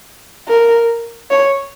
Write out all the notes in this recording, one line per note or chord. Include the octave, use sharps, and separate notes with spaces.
A#4
C#5